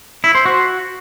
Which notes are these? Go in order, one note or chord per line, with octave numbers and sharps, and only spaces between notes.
E4
C5
F#4